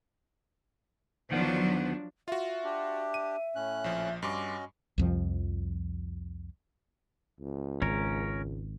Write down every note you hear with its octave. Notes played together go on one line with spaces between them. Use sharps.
D2 D#3 F3 F#3 B3 D4
F4 F#4 E5
D4 G4
D#7
A2 C#4 F#6
A#1 F3
G2 C#4 F#4 D#5 C6 D6
C2 F2 F3
C#2
G#1 C#4 A#4